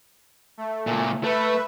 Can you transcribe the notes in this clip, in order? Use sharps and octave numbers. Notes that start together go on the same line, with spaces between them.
A3
C#2 A#2
A3 B4 E5